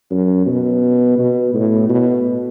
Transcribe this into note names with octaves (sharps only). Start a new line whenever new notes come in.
F#2
B2
B2
A2
B2